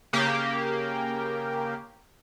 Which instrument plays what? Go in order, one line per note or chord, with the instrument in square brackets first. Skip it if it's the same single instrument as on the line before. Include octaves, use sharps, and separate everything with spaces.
[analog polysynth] C#3 A#3 G4